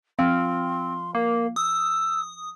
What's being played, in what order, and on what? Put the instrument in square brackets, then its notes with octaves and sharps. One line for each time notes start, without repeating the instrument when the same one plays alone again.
[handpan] F3 F5 [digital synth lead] C4 [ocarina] C6
[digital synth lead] A#3 [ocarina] A#4
[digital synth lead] D#6 [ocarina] E6